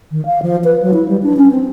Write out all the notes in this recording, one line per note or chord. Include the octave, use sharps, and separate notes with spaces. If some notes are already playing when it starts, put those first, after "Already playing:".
D#3
F5
F3
B4
F#3
E4
G3
D4
C#4
C4